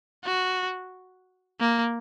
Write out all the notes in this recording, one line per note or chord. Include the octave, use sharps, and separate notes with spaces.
F#4
A#3